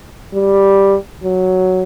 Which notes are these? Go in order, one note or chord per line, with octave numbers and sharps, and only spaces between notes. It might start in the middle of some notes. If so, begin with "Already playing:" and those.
G3
F#3